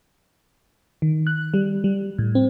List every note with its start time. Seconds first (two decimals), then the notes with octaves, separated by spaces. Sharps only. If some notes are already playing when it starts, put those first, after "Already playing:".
1.02 D#3
1.27 F#6
1.54 G3
1.84 G3
2.19 A2
2.35 C4